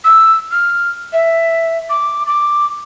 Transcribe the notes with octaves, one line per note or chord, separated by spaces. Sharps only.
E6
F6
E5
D6
D6